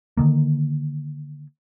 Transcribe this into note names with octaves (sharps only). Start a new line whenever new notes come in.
D3 D#3 A#3